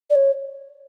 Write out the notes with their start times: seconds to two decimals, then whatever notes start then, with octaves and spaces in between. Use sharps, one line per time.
0.10 D5
0.15 C#5